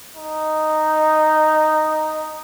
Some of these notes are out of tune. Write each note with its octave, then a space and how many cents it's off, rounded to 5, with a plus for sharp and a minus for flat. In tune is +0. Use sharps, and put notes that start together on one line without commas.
D#4 -5